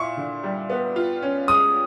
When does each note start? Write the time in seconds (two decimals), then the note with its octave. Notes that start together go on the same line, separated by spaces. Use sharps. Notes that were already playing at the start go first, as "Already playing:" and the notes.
Already playing: A#2 E4 C#6
0.17 D3
0.43 G3
0.70 B3
0.96 F4
1.22 C#4
1.48 G#3 D#6